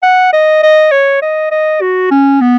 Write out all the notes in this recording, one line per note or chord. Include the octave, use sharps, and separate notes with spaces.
F#5
D#5
D#5
C#5
D#5
D#5
F#4
C#4
B3